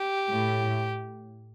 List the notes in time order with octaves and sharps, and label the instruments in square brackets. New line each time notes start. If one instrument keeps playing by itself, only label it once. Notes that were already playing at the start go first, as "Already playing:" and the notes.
Already playing: [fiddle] G4
[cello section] A2